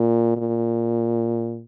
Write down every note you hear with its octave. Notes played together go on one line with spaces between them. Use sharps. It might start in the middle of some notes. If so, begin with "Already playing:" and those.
Already playing: A#2
A#2